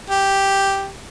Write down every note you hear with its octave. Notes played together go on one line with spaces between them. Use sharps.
G4